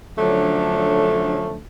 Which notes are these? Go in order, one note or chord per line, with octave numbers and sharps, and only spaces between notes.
D3 F3 F#3 A3 C#4 D4